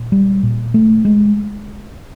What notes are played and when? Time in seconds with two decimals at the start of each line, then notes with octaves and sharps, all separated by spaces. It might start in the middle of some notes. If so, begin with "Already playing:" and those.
Already playing: A#2
0.12 G3
0.43 A#2
0.74 A3
1.05 G#3